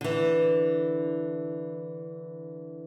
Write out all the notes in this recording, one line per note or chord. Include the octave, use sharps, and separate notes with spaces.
D3 E3